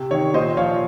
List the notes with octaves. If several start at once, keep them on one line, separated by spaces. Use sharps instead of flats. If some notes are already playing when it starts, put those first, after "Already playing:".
Already playing: C3
D#3 C#5
A#2 C5 D#5
F3 C#5 F5